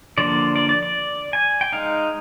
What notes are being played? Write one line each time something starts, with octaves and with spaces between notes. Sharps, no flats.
D3 F3 A#3 D5
D5
D5
D5
G#5
G5
G#3 D#4 F5